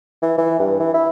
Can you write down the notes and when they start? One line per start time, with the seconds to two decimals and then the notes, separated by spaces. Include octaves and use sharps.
0.22 E3
0.38 E3
0.59 G2
0.79 E3
0.94 E4